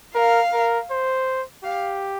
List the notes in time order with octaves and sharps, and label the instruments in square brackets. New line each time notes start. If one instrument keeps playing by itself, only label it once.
[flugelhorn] A#4 [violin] F5
[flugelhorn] A#4
C5
[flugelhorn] G4 [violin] F5